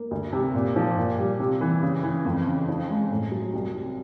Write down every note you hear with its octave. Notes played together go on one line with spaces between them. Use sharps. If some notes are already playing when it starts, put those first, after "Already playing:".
Already playing: A#3
D2
C3
A#2
F3
A#2
G3
C3
E3
C#3
E3
F2
C#3
F3
G#3
A2
F#3
C2
C3